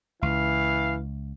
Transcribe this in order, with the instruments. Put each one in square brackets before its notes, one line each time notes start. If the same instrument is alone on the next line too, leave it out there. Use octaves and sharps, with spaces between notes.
[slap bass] C#2 [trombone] E3 [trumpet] F5